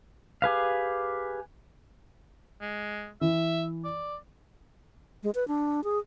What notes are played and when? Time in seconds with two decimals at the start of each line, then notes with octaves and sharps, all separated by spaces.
0.42 G4 G#4 B4 F5
2.61 G#3
3.21 E3 E5
3.84 D5
5.23 G#3
5.35 B4
5.48 D4
5.84 G#4